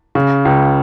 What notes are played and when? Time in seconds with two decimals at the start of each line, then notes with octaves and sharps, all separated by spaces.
0.15 C#3
0.45 C#2